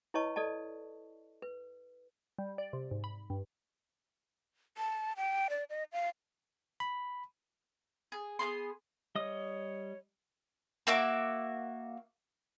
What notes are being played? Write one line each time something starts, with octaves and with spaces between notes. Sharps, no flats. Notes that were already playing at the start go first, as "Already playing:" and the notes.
E4 B4 C#5 D#5 A5 C#6
A4 D5 D#5 A5
B4
G3
D5
C3
G#2
B5
G2
A5
G5
D5
D#5
F5
B5
G#4
B3 C4 G#4 C6
G3 C#5 D#5 D#6
A#3 F#4 E5 D6